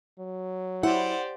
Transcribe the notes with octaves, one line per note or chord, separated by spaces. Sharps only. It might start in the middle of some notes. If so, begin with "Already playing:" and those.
F#3
E4 G4 C5 D5 F#5